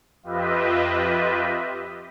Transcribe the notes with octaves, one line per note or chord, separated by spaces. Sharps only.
F2 F4 G4 B4 D#5 E5